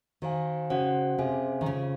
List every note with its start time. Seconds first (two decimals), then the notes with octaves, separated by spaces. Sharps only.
0.22 D#3 F#4 C5 F5 G#5
0.70 C#3 C#4 F#4 C5 F#5
1.18 C3 C#4 G#4 C5 F5 G#5
1.61 D#3
1.66 C#3 F4 G#4 C5 F5